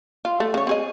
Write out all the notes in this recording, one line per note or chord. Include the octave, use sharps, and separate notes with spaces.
F4
A3
C#3 C#5
C4 G#4 D#5